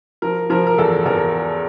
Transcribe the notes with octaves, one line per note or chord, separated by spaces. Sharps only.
F3 A#4
F3 A#4
A#4
E2 A4
E2 A#4